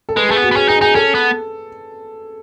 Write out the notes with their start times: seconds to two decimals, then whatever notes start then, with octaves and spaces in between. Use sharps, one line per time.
0.09 A4
0.16 G#3 B4
0.29 A3 G#4
0.36 B3
0.42 F#4
0.51 B3
0.56 C#4 G#4
0.68 D#4 G#4
0.81 D#4 G#4
0.95 C#4 A4
1.15 B3